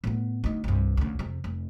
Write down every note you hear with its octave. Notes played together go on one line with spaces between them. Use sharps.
A2 B3
D2 D#4
C2 G2
D2 C#3
F2 C3
F1